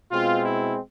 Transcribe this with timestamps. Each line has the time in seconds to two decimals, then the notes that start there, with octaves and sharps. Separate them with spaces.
0.11 B2 G#3 C4 F4
0.44 E4